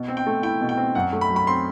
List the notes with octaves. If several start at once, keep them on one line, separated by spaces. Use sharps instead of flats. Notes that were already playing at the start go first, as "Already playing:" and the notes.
Already playing: B2
C4
G5
A3
E4 G5
B2
G5
C4
F#2 F#5
A3
B5
F#3
B5
C4 C6